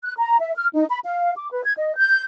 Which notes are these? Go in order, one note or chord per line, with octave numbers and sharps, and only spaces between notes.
F#6
A#5
E5
F6
D#4
B5
F5
D6
B4
G#6
D#5
G6